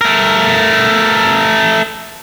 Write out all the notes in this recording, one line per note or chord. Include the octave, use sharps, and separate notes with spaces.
A3 A#4